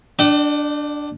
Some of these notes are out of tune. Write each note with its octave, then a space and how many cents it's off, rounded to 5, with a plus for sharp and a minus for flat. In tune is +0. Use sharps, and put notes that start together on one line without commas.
D4 +0 D5 +45 G5 -30